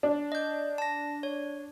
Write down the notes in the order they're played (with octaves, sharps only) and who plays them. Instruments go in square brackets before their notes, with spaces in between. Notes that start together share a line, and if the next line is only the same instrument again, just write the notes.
[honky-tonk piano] D4
[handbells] D#5 G6
A5 A#6
C#5